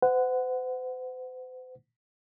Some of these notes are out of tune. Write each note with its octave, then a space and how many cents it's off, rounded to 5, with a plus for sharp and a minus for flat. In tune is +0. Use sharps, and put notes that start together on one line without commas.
C5 -45 F#5 +0